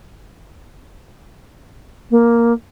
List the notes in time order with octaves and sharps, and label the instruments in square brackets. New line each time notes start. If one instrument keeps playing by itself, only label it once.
[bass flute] A#3